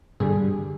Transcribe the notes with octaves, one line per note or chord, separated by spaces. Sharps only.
G2 D3 G3 G#4